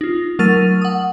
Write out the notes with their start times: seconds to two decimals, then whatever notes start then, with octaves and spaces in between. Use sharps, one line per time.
0.01 D#4 F4
0.39 F#3 A3 A#4 F6 A6 D#7
0.82 F#5 D#6